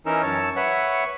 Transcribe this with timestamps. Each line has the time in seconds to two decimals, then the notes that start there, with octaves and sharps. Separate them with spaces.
0.06 E3 C#4 D#4 A#4 E6
0.23 F#2 C#5 A5 E6
0.56 B4 C#5 E5 F#5